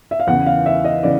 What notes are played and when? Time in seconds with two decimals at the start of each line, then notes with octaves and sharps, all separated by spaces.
0.11 E5
0.20 F5
0.27 E2 C#3 E3 F#5
0.46 F5
0.66 E5
0.84 D#5
1.03 C#3 E3 D5